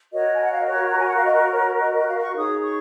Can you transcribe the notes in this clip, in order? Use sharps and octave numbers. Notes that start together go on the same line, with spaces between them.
F#4 A#4 C#5 D#5
G#5
F#5
F5
D#5
C#5
A#5
G#5
F#5
F5
D#5
C#5
D#5
D#5
F5
C#6
D#4 G#4 C#5 D#6
C#6